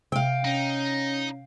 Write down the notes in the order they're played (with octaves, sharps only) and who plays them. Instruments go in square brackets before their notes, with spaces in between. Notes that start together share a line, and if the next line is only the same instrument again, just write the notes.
[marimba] C3 [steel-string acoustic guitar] F5 G5
[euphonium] C#4 [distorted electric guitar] D#4